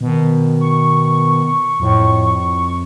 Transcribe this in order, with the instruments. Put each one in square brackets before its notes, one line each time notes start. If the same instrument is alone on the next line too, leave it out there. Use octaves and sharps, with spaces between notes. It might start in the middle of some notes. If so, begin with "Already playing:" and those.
[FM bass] B2 [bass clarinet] D#3
[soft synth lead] C#6
[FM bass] F2 [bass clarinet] A2